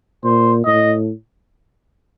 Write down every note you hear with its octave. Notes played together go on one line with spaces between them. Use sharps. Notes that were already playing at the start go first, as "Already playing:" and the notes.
A#2 C5
A2 D#5